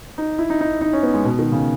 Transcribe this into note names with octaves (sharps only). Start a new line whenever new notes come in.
D#4
E4
D#4
D#4
D#4
C#4
B3
G#3
B2
D#3
C#3